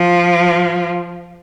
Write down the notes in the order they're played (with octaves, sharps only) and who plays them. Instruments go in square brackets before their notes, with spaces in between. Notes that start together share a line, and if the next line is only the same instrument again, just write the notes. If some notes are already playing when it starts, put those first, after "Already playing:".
Already playing: [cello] F3